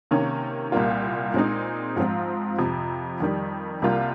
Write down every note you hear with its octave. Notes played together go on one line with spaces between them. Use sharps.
C3 D#3 A#3 C#4
C2 A#2 G3 A#3 F4
A#2 G#3 C4 D#4
G#2 F3 C4 F4
F2 C3 F3
F2 D#3 G3
C2 C3 G3 A#3 F4